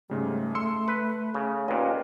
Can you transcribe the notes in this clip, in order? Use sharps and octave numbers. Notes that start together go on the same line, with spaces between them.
G#2 C#3 G3 A3
C6 E6 C#7
B4
C#3
D#2 A#2 C#4 B4 D#5